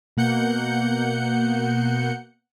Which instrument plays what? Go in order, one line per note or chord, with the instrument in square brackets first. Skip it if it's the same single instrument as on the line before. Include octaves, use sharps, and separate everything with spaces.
[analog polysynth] B2 A#3 F#5 G6 C#7